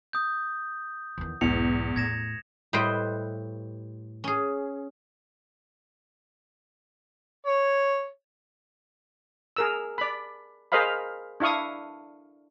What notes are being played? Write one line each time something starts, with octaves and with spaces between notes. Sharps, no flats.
D#6 G6
E2 D#3
B1 E2 G#2 C#7 F7
A2 G#6 A#6 E7
A2 G3 B4 C5 D#5 G5
C#4 G#4
C#5
G#4 A#4 E6
D5 B5
G#4 A#4 C5 D#5 F5 B5
D4 E4 F5 C#6 D#6